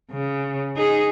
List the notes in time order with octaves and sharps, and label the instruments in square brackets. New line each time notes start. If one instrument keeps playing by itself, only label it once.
[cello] C#3
D#4 G#4